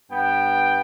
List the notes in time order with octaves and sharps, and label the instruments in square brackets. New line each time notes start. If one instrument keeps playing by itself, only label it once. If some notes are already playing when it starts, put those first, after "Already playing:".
[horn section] G2 B3 G5